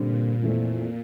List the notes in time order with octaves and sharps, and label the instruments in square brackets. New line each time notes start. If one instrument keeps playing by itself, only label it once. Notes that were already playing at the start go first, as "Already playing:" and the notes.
Already playing: [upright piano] G2 D3 G3 C4 [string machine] A#2
[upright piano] F2 E3 A3 C4